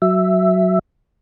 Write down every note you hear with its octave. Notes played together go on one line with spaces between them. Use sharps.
F#3 E5